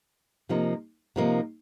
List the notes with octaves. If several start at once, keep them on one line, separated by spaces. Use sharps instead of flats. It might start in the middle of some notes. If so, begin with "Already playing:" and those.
C3 F3 A#3 D#4
C3 F3 A#3 D#4